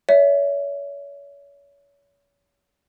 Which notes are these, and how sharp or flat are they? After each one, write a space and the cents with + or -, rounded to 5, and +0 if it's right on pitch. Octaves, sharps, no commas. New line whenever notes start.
C#5 +35 E5 +0